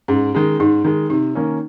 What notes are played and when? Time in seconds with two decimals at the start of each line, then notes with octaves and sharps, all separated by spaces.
0.08 G#2 C#4
0.35 D#3 G#3
0.60 G#2 D#4
0.85 D#3 G#3
1.10 C3 D#4
1.35 D#3 A#3 C#4